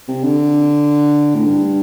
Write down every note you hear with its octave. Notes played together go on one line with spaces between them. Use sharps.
C3
D3
A2
G2